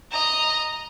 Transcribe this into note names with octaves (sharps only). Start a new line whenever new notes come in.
D#5 A#5